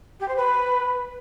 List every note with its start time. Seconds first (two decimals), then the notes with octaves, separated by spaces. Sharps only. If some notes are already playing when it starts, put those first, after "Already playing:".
0.20 G4
0.28 C5
0.37 B4